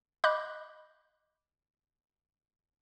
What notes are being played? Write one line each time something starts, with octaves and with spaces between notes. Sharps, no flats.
D#5 B5 D6 F#6 G6